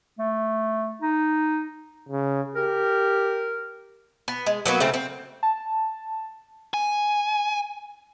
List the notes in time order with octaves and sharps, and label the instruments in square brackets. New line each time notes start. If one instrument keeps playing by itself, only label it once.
[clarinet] A3
D#4
[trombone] C#3
[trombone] G4 [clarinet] A#4
[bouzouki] B3
G#3
F#3 A#3 B3 F#4
C#3 A3 C4
C4
[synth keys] A5
[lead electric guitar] G#5